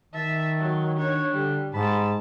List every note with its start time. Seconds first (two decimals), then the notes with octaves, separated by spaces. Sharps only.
0.14 D#3 E5 A5
0.59 F#3
0.98 D4 C#5
1.31 D3 G3
1.74 G#2 A5 B5